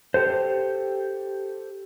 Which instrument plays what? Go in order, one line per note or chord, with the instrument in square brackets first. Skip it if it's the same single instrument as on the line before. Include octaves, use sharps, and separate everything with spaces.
[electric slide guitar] G4 A4 C5